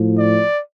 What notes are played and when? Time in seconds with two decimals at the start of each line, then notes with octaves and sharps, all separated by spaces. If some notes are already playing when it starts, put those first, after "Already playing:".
Already playing: A2 F3
0.17 D5